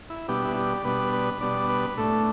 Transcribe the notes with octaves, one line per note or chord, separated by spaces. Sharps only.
E4
B2 G3 B3 D4 G4
E4
G4
D5
B2 G3 B3 D4 B4
B4
B2 G3 B3 D4 D5
B4
A2 A3 D4 A4